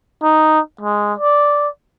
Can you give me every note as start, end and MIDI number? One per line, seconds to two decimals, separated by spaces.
0.23 0.60 63
0.81 1.13 56
1.18 1.68 74